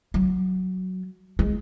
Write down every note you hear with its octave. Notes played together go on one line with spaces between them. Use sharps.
F#3
G#3